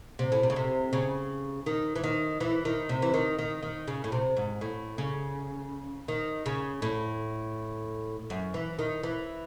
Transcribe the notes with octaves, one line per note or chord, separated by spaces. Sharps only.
C3
A2
C3
C#3
C3
C#3
D#3
E3
D#3
E3
D#3
C3
E3
D#3
D#3
D#3
C#3
A2
C3
G#2
A2
C#3
D#3
C#3
A2
F#2
E3
D#3
E3